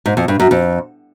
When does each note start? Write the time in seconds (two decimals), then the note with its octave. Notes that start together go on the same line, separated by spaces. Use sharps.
0.06 G#2
0.17 F2
0.28 G2
0.40 F#2
0.51 F2